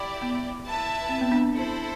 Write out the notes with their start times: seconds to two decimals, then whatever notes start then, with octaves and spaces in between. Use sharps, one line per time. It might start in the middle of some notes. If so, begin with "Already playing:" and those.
Already playing: E4 G4 D5
0.22 B3
0.66 E4 B4 E5 A5
1.09 C4
1.21 B3
1.31 B3 D4
1.53 E4 A4 C5